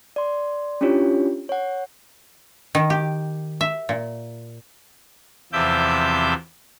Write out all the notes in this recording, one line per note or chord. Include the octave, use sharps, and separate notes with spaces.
D5 C6
C#4 D4 E4 F4 G4 C#5
C#5 F#5
D#3
G4
E5
A#2
E2 C3 F3 E5 D6 G6